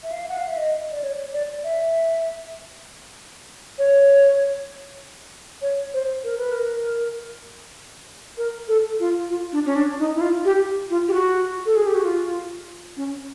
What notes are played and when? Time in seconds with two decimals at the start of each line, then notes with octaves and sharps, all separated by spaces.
0.03 E5
0.12 F5
0.29 F#5
0.38 F5
0.48 E5
0.57 D#5
0.91 D5
1.03 C#5
1.33 D5
1.64 E5
3.78 C#5
5.62 C#5
5.94 C5
6.24 A#4
6.38 B4
6.52 A#4
8.37 A#4
8.68 A4
9.00 F4
9.29 F4
9.52 D4
9.66 C#4
9.75 D4
9.99 D#4
10.15 E4
10.21 F4
10.45 G4
10.90 F4
11.08 G4
11.13 F#4
11.66 A4
11.76 G#4
11.86 G4
11.95 F#4
12.05 F4
12.97 C#4